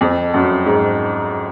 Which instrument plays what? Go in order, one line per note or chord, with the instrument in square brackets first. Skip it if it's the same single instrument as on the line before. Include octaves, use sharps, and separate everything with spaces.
[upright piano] F2
F#2
G#2